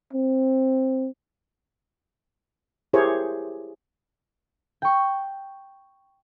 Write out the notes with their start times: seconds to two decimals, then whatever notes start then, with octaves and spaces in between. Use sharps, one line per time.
0.13 C4
2.93 E4 G4 G#4 A#4 C5 C#5
4.82 G5 C#6